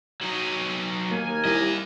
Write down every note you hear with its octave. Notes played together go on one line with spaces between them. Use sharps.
F#3 D#4
D#2 A#3 A#4 G#5
G3 A#3 E4 D#5